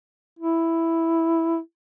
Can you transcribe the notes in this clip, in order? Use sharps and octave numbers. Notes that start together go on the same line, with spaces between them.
E4